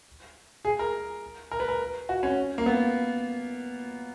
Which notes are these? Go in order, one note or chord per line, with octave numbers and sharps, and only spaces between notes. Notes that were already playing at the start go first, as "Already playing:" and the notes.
G#4
A#4
A#4
B4
A#4
F#4
C#4
A#3
B3